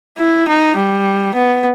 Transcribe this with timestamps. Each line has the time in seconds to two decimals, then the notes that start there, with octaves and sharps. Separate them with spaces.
0.18 E4
0.48 D#4
0.76 G3
1.35 B3